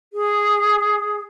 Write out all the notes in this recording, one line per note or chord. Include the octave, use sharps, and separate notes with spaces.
G#4